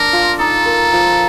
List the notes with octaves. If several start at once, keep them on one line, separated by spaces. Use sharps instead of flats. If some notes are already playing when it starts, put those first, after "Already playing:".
Already playing: D4 A#4
F4
D#4 A4
A#4
F3